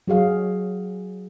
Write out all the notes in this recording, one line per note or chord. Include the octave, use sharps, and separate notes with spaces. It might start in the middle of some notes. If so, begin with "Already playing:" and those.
F#3 F#4 G#4 F5